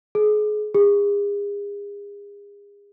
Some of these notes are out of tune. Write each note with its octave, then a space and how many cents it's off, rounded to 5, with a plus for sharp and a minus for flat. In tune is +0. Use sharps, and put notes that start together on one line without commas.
G#4 +30
G#4 -40